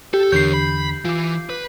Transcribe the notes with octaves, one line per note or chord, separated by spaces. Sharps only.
G4 A4
E2 D3 A#4 C#5 G6 C7
B5
E3 F4 D6
B4